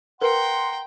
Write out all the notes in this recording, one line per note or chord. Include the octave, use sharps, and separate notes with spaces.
A#4 B4 F#5 G5 A#5 C6